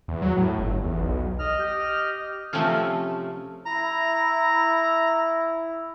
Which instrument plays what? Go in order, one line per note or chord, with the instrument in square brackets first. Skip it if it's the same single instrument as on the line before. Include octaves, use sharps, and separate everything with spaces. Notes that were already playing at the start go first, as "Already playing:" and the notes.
[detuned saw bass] E2
F#3
A2
G1
E2
B1
[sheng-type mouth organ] D#5 F6
[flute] G4
[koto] C3 F3 A3 C4 C#4 F4
[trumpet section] E4 [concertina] A#5